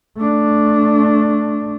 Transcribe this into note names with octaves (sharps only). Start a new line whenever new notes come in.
A3 D4